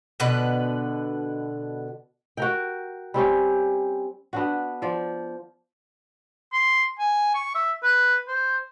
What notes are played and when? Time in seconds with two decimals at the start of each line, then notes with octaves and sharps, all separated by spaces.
0.20 B2 D3 B4
2.37 F#4 A#4 G5
3.14 G3 C4 C#4 G4
4.33 B3 D4 F#4
4.82 F3 D5
6.53 C6
6.99 G#5
7.34 C#6
7.55 E5
7.83 B4
8.28 C5